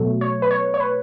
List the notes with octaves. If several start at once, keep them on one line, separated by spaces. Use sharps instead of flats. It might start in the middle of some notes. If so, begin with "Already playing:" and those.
Already playing: B2 F#3 A3
C#5
B4
C#5
C#5
B4